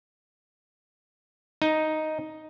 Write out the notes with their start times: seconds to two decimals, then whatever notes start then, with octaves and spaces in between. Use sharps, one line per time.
1.62 D#4